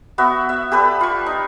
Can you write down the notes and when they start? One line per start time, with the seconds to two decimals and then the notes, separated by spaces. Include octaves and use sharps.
0.18 B3 F#4 E5
0.49 E5
0.72 G4 A4 B4 D5
1.01 F4 C#6
1.26 D#4